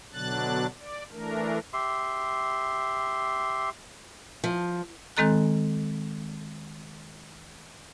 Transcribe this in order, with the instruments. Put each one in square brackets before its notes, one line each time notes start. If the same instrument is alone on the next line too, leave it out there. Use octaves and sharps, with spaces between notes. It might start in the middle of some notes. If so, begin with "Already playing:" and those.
[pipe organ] B2 D3 F#3 D4 F#6 A6
D5
E3 A3 D4 A#4
[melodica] G4 E5 C6
[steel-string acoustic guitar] F3
[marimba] D#3 G#3 C4 A4 A#5 F#6